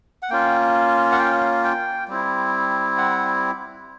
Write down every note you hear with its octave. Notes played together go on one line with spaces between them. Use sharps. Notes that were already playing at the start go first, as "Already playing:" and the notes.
F#5
A#3 C#4 F4 G5
F#5
G5
G5
G3 C4 E4
F#5